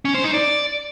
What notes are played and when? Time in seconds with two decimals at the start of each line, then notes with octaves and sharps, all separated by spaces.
0.05 C#4
0.15 C5
0.24 D#4
0.34 D5